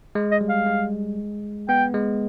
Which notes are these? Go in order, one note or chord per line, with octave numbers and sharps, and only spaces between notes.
G#3
D#5
G3
F5
G#3
B3 G5
G#3